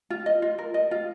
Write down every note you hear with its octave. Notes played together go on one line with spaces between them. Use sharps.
F4
D#5
F4
A#4
D#5
F4